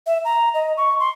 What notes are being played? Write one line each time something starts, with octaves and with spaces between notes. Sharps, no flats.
E5
A#5
D#5
C#6
C6